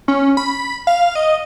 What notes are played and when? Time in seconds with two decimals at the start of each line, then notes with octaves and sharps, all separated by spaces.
0.08 C#4
0.37 B5
0.87 F5
1.15 D#5